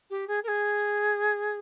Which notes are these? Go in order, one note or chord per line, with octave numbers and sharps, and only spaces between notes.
G4
G#4
A#4
G#4